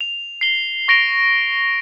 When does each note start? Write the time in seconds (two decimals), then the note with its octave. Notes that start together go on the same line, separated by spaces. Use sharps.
0.01 F7
0.41 C7 G7
0.88 C#6 A#6 D7 F7 G7